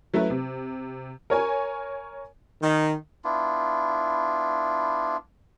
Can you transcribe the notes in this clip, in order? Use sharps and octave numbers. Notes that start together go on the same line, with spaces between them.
F#3 A3 C#4 E4 B4
C3
A#4 C#5 G#5
D#3
B3 D4 E4 F4